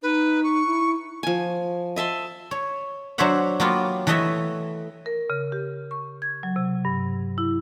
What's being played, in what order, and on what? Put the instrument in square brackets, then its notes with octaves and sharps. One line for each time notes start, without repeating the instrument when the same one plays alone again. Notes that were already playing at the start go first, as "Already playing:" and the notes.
[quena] D#4 [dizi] B4
[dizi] C#6
[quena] E4
[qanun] F3 G#5
D#5 E5 A5 C6
[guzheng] C#5
F#3 D4 C5 C#5 E5 F#5
F#3 A#3 B3 F4 G4
E3 A3 C#5 D#5 E5
[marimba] A#4
C#3
G4
C#6
G#6
F#3
C3
G2
E4